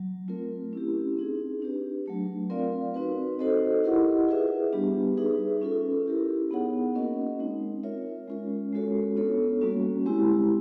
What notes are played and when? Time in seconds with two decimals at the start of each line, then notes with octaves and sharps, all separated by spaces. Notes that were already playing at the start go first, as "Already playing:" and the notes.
Already playing: F#3
0.28 A3 C4 F4 A#4
0.73 C#4 E4 G4
1.17 C4 D#4 G#4
1.62 D4 G4 B4
2.06 F#3 A3 D4
2.50 C4 F4 A#4 D5 F5
2.94 C4 D#4 F#4 B4
3.39 D#4 F#4 A4 C5 D#5
3.84 E4 G4 A#4 D#5 F#5
4.28 F4 G#4 B4 E5
4.73 G3 B3 D4 G4
5.17 D#4 G#4 B4 E5
5.61 C#4 F4 A4
6.06 E4 G4 A#4
6.51 B3 D#4 G#4 C#5 F#5
6.95 A#3 C#4 F#4 A#4 D#5
7.39 G#3 C4 D#4
7.83 F4 A#4 C#5 E5
8.28 G#3 C#4 F4 A#4
8.72 G#3 C#4 F#4 A4 C#5
9.17 B3 D4 F4 A4 C#5
9.61 G3 A#3 C#4 F#4
10.06 G#3 C4 E4 G4